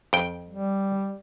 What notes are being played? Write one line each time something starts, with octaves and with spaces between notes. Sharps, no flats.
F2 G5
G3